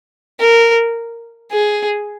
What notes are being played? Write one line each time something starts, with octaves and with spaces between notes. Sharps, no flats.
A#4
G#4